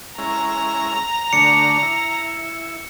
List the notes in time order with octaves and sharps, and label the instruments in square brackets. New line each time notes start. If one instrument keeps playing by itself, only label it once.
[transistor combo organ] G#3 C#4 E4 [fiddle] A#5
[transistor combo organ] D3 A3 D4 [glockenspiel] C#7
[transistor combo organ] E4